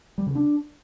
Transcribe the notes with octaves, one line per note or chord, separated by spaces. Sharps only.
G3
C#3
D4